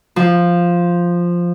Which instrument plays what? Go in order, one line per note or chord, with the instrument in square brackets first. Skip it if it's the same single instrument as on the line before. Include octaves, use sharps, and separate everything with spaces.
[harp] F3